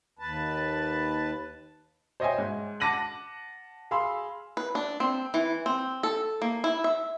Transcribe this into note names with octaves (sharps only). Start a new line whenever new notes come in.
D#2 B4 A5
C5 C#5 D#5 E5 G5 G#5
G#2
F#5 A5 D6 A#6 D#7 F#7
G#4 F5 B5 C6 E6
B4
D4
C4
E3
C4
A4
A#3
E4
E5